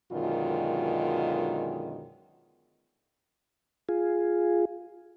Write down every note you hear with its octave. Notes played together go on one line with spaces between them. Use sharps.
F#2 B2 D3 D#3 G#3 F4
F4 G#4